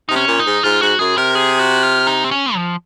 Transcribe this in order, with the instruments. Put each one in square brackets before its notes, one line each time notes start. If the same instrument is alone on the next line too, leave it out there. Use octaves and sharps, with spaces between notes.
[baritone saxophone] C3 [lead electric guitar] D#4
[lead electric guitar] C#4
[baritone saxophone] A#2
[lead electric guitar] D#4
[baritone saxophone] G#2
[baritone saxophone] G#2 [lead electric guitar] F4
[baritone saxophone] G#2 [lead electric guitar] F#4
[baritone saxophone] F#2 [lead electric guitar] G#4
[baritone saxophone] C3 [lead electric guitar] A#4
[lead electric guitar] G#4
F#4
F4
D#4
C4
C#4
F3